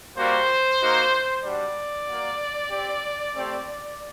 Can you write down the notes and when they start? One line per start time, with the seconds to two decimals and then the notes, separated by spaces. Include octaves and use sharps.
0.18 G3 A#3 F#4 C5
0.81 A#3 D#4 F#4
1.45 G3 D4 F#4 D5
2.08 A#3 F#4
2.71 C4 G4
3.35 A3 C4 G4